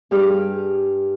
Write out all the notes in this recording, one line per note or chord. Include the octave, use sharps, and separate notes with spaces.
G2 G4 G#4 F6